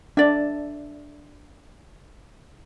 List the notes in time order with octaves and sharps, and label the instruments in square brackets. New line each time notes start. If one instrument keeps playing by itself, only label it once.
[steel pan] D4 [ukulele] D5 E5